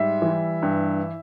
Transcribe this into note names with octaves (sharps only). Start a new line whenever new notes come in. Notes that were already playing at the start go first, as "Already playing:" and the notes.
Already playing: G#2 G3 E5
E3
G2